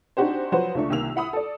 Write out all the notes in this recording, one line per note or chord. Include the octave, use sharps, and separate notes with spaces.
C4 D4 D#4 F#4 G4 C5
F3 F#3 F#4 B4 C5
C#2 A3 D4 C#6
C2 D#3 A#3 E6 F7
E4 F#5 B5 D#6
A4 D5